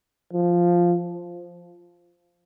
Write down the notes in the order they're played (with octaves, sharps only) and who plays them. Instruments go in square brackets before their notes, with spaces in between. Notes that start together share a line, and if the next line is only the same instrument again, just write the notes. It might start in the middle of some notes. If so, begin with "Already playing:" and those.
[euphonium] F3